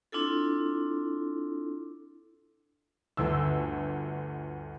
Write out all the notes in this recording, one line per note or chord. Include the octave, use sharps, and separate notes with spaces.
C4 D4 E4 F4 A4
G1 D2 E6